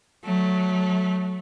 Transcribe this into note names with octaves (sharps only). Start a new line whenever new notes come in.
F#3 A3